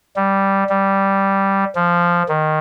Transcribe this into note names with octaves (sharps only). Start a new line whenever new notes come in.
G3
G3
F3
D#3